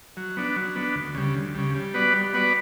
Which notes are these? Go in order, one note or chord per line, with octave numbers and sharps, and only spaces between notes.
F#3
B3 D4
F#3
B3 D4
D2
C#3 G3
D2
C#3 G3
G3
B3 F#4 B4 D5
G3
B3 F#4 B4 D5